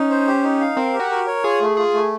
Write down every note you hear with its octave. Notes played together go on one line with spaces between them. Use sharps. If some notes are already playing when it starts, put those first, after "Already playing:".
Already playing: C#4 D#4
C5
G4
D#4
F5
C4 A#4
G4
F#4
A#4
C#5
F4 G#4
A3
F4 G#4
A3